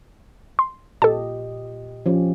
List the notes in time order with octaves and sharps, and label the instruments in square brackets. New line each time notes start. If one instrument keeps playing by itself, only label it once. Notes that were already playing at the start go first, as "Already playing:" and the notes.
[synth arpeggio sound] C6
[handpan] A#2 G4 D#5 [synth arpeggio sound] A4 A5
[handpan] F3 C#4 G4